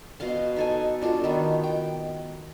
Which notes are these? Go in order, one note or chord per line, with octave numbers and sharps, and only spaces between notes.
B2 D#5 F5 C6
D#4 A4 G#5
D4 F4 F#4 A4
D#3 B3 D#4
G5